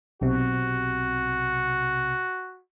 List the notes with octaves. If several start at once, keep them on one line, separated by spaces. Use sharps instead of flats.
B1 C3 F#4